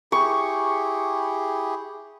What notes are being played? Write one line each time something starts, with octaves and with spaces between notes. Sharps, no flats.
E4 G4 G#4 C#6